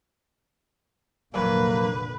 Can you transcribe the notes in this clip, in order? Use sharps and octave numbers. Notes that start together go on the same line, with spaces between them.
F1 A#2 D3 F3 F#3 A#3 B4 D5